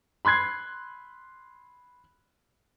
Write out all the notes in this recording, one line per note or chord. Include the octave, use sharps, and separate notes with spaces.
B5 C6 F#6 G#6 C7